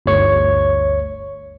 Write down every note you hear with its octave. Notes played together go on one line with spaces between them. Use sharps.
G1 D2 C#5 C#6